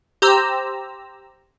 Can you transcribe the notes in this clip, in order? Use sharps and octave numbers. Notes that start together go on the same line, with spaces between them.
G4 C5 A#5 E6